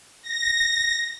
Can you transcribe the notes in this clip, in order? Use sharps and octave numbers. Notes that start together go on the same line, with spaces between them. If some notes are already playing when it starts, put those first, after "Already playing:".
A#6